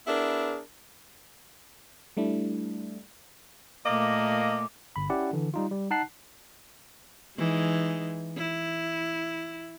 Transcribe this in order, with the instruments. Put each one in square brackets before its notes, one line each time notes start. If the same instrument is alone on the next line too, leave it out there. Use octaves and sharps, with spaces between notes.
[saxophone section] B3 D4 E4 G#4 A#4
[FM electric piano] G3 A3 D4 E4
[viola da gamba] A#2 A3 [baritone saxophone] A#3 [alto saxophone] D#5 [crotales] D6
[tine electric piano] G1 B5
C#4 E4 G4 D5 F#5
D3 E3
G3 D#4 F4
G3
D#4 F#5 A5 F#6 C7
[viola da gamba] E3 G#3 D#4
E4